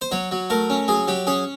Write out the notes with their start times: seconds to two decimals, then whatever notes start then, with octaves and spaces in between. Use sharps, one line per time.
0.02 C5
0.12 F#3 C#5
0.31 F#3
0.50 A3 A#4
0.70 C#4
0.88 F#3 G#4
1.08 F#3 G4
1.27 C#4 G#4